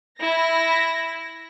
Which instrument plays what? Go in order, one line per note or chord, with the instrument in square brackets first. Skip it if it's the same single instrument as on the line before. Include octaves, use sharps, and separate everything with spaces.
[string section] E4 A#6